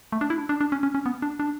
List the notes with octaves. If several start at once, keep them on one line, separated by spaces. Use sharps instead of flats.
A3
D4
E4
D4
D4
D4
C#4
C#4
C#4
B3
D4
D4